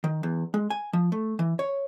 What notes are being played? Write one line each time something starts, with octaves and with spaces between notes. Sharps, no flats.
D#3
E2
G#3
G#5
F3
A3
E3
C#5